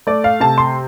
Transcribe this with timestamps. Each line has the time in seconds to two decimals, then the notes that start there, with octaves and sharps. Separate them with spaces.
0.07 A3 D5
0.24 F5
0.40 C3 A5
0.58 C6